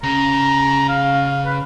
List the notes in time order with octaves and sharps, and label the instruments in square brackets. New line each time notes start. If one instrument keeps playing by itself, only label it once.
[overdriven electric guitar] C#3 [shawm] A#5
[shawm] F5
F5
B4